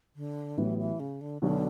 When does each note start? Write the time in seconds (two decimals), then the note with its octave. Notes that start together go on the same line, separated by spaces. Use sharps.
0.16 D3
0.57 A1 A2 E3 F#3 B3
0.78 E3
1.00 C#3
1.21 D3
1.42 B1 B2 D3 F#3 B3